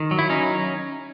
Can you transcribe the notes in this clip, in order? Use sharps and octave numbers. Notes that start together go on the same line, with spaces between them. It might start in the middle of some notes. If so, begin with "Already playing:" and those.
Already playing: D#3
F#3
E4
C#4 D#4